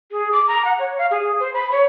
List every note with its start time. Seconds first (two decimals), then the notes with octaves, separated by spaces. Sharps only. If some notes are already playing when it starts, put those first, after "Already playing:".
0.12 G#4
0.32 D6
0.48 A#5
0.65 F#5
0.79 C#5
0.98 F5
1.11 G#4
1.40 C5
1.54 B5
1.72 C#5